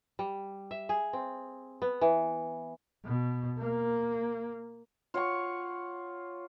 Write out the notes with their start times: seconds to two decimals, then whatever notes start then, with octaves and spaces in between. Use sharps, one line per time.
0.19 G3
0.71 E5
0.89 G#4
1.13 C4
1.82 B3
2.01 E3
3.05 B2
3.59 A#3
5.14 F4 C#5 F#5 C#6